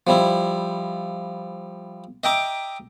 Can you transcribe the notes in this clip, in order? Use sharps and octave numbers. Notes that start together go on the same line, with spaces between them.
F3 G3 E4
D#5 E5 G5 A#5 D6